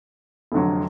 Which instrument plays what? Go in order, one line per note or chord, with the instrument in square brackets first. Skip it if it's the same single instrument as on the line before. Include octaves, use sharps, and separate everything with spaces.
[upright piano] F1 F2 D3 F#3